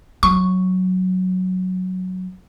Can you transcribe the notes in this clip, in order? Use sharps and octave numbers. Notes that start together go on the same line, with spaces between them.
F#3 C#6